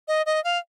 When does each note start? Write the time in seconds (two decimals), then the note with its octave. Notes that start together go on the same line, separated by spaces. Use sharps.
0.08 D#5
0.26 D#5
0.44 F5